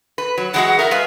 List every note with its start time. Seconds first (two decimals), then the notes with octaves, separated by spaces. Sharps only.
0.18 B4
0.38 F#3
0.54 E3 G#3 F#4 F#5
0.79 A#4 E5
0.91 G#3 B4 F5